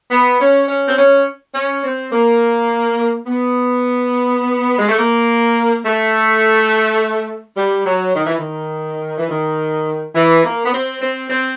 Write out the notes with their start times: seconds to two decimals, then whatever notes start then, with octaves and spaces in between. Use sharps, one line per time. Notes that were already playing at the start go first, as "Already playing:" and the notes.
0.11 B3
0.40 C#4
0.68 C#4
0.88 C4
0.97 C#4
1.54 C#4
1.84 C4
2.12 A#3
3.26 B3
4.79 G#3
4.89 A3
4.99 A#3
5.85 A3
7.57 G3
7.86 F#3
8.15 D#3
8.26 E3
8.38 D#3
9.18 E3
9.29 D#3
10.15 E3
10.44 A#3
10.65 B3
10.72 C4
11.01 C4
11.30 C4